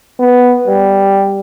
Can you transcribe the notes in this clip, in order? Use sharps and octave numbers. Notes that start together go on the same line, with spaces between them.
B3
G3